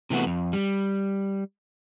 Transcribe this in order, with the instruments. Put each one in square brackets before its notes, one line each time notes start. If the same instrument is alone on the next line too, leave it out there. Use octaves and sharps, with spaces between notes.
[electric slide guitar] C3 E3 A3 B3 F#4
F2
G3